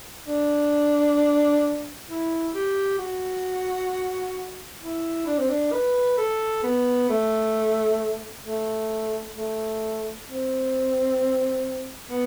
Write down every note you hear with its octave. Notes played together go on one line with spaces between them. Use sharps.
D4
E4
G4
F#4
E4
D4
C4
D4
B4
A4
B3
A3
A3
A3
C4
B3